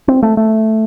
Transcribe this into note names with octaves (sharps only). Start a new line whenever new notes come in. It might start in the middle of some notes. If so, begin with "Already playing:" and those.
C4
A3
A3